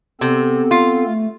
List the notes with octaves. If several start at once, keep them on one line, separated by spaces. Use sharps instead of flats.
C3 B3 C4 A4
F4
A3